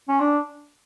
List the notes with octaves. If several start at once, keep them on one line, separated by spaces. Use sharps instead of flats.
C#4
D4